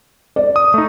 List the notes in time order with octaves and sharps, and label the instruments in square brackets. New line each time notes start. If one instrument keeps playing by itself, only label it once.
[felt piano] D5
[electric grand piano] D#6
A3 D#4